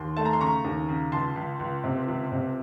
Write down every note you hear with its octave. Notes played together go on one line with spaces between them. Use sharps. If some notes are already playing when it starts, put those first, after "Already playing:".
Already playing: D#2 C6
A3 A5
A#5
C6
C#3 A#5 C#6
D#2
C#3
C#2 A5 C6
C#2
C#2
C3
C#2
C3